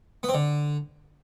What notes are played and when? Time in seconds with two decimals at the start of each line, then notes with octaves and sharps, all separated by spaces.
0.23 B3
0.29 C4
0.34 D3